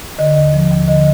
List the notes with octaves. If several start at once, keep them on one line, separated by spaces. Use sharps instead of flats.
D3 D#5
D#2
F3
D#2
D3 D#5